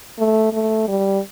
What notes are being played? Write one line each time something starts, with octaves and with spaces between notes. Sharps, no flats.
A3
A3
G3